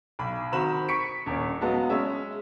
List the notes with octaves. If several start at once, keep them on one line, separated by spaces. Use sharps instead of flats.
B1 B5
D#3 C4 F#4 B5 E7
C#6 B6 C#7 D7
D#1 C#4
F#3 G#3 B3 D#5 F5 A5
G#3 C#4 E5